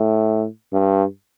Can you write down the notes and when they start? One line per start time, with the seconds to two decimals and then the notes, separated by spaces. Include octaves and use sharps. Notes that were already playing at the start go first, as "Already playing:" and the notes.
Already playing: A2
0.72 G2